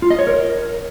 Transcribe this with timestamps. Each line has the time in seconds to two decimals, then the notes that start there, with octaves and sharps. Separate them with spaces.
0.02 F4
0.10 D#5
0.19 C#5
0.27 A#4